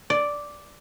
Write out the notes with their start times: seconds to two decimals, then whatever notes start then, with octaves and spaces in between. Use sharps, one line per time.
0.10 D5